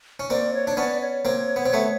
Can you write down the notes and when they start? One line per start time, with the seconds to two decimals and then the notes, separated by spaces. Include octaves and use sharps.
0.20 C#4
0.30 A#3 C4 D5
0.54 C#5
0.67 D4
0.77 B3 C#4 D5
1.01 C#5
1.25 A#3 C4
1.56 B3
1.66 C4
1.73 A3 B3